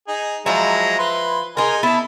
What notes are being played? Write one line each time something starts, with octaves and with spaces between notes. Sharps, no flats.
D#4 G#4
F3 F#3 G#3 E4 A#5
B4 C6
D#4 G#4 A#4 G#5 C6
B3 E4 A5